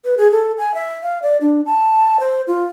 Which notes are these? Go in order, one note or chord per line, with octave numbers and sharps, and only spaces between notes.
B4
G#4
A4
G#5
E5
F5
D5
D4
A5
C5
F4